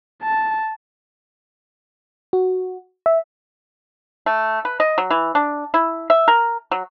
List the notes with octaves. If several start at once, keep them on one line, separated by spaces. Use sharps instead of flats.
A5
F#4
E5
A3
B4
D#5
F#3
E3
D4
E4
E5
A#4
F#3